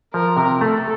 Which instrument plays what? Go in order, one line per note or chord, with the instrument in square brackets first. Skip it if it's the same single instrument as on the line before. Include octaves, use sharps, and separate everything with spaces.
[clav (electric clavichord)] F3 [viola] A#4
[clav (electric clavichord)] C3
[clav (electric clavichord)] A3 [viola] A4